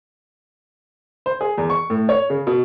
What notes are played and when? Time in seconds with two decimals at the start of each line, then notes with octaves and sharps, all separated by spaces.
1.26 C5
1.41 G#4
1.58 E2
1.70 C#6
1.90 A2
2.09 C#5
2.30 C#3
2.47 B2